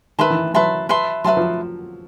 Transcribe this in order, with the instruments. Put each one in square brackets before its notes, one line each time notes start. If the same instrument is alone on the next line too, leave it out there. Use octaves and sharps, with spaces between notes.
[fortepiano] D#3 [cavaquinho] B4 E5 A5 C6
[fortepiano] E3
[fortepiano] F#3 [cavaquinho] B4 E5 A5 C6
[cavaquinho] B4 E5 A5 C6
[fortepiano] F#3 [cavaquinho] B4 E5 A5 C6
[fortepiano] F3